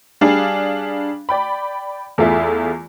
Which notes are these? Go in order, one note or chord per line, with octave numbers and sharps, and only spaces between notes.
G3 D4 G#4 F5
D5 G5 B5
E2 A3 E4 F4 G#4 E5